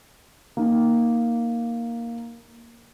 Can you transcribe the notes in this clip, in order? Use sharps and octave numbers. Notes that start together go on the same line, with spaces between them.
A#3 D#4